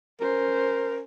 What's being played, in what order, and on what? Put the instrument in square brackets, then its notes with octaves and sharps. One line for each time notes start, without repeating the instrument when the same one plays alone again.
[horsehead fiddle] C#4 C5 [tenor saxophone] A#4